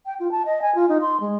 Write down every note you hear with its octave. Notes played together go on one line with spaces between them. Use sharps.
G5
F4
A5
D#5
G#5
F4
D#4
C6
G#3